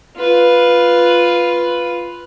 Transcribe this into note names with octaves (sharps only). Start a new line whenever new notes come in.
F4 B4